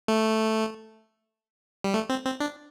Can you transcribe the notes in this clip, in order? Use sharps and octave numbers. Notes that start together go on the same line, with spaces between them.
A3
G3
A3
C4
C4
D4